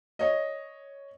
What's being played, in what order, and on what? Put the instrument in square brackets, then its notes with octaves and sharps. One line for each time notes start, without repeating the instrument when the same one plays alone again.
[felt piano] C#5 D#5